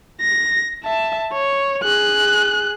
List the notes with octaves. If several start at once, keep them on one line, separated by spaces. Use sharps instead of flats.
A#6
E5 A5
C#5
G#4 F#6